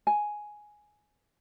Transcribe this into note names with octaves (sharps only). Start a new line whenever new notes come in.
G#5